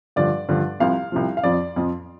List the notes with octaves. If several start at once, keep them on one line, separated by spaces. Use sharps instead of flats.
G2 D3 F3 D5
G2 D3 F3
C2 C3 F3 F5
C2 C3 F3
F5
F2 F3 D5
F2 F3